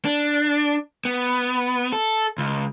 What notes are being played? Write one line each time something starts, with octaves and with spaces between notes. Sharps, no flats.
D4
B3
A4
C#2